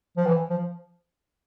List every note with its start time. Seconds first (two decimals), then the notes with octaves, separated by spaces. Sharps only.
0.17 F3
0.26 E3
0.50 F3